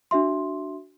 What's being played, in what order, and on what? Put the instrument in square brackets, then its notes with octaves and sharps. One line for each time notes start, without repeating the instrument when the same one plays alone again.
[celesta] D4 F#4 E5 C6